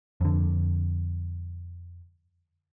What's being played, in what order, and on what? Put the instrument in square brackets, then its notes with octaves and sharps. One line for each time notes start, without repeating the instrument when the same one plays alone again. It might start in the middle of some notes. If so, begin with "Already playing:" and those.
[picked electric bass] F2 D3